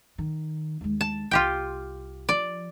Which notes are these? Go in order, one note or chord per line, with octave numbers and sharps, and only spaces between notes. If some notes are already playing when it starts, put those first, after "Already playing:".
D#3
D#2 G#3
A5
C2 F4 G4 G5
F3 D5